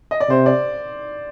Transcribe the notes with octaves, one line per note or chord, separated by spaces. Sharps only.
D#5
D5
C3 C5
D5